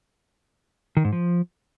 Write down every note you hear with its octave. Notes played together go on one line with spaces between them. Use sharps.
D#3
G#2
F3